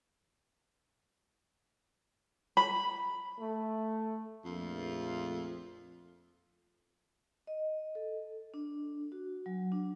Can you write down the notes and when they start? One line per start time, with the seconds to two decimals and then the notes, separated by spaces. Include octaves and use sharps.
2.57 B5
3.39 A3
4.45 A#1 F2 A3 F4
7.47 D#5
7.95 A4
8.54 D4
9.12 F#4
9.46 F#3
9.72 D4